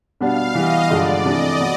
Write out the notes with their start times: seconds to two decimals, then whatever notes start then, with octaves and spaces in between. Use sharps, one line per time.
0.21 B2 G3 B3 D4 F5
0.55 E3 G3 B3 D#5
0.90 G2 D3 F3 G#3 D5
1.25 C3 E3 A3 D4 D#5
1.60 F#3 B3